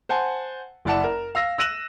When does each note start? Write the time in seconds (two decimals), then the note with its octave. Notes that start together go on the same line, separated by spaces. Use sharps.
0.09 C5 F#5 G#5 A5
0.85 F#1 E4 D5 F#5 A5 E7
1.04 A#4
1.35 F5 E6 A#6
1.58 E6 F#6 A#6 D#7 E7 F#7